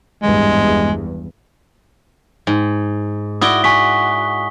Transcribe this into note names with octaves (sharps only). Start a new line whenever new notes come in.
G#1 E2 G2 G#3
G#2
E4 F#4 D5 D#6 G7
F#4 G#5 C#6 B6